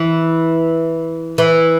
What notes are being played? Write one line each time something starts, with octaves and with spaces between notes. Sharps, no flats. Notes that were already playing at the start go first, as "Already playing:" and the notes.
Already playing: E3
E3